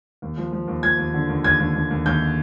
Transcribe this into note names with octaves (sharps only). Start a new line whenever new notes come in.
D#2
F3
F3
D#2
F3 G#6
D#2
D3
D#2
D#2 G#6
D#2
D#2
D#2
D#2 G6